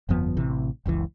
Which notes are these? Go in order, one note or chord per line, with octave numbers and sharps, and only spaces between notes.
G1 F2 F3 B3
A1 C3 E3
F#1 C#2 A#2 E3